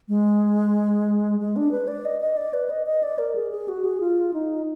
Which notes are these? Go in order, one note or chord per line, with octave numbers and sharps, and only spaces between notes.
G#3
G#3
D4
B4
D5
D#5
D#5
D5
B4
D#5
D#5
D5
A#4
G#4
G#4
F#4
G#4
F4
D#4